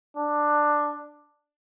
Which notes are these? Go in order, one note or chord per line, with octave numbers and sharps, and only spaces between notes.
D4